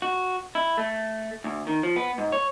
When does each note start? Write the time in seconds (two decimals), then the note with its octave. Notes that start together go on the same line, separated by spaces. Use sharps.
0.02 F#4
0.55 E4
0.78 A3
1.44 D2
1.67 D#3
1.83 F3
1.96 B3
2.18 G#2
2.32 C#5